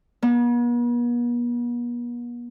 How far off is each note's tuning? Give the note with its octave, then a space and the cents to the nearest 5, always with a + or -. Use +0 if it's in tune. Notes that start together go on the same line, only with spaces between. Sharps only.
B3 -45